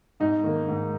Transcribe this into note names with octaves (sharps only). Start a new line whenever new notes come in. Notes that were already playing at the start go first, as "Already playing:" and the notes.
G#2 D#4
D#3 A#3
G#2